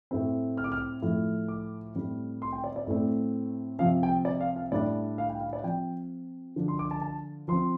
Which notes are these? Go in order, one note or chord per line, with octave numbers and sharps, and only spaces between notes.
A2 A3 C4
F6
D6
F6
A2 F3 A3
D6
A2 G3 C4
C6
G5
D5
D5
A2 A3 C4
C3 F3 C4 F5
G5
D5
F5
F5
A2 G3 D4 D5
F5
G5
F5
D5
F3 C4 G5
D3 F3 D4
C6
D6
A5
A5
F3 C4 C6